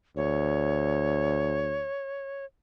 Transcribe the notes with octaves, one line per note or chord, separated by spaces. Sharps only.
D2 C#5